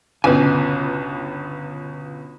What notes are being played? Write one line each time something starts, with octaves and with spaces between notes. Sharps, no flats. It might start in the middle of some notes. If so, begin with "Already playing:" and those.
G1 C#2 B2 B4 G#5